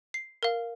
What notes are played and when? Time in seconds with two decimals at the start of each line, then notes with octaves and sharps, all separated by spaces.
0.14 C7
0.43 A#4 F5